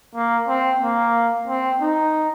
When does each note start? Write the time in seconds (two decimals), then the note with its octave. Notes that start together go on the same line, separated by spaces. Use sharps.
0.15 A#3
0.48 C4
0.82 A#3
1.47 C4
1.81 D#4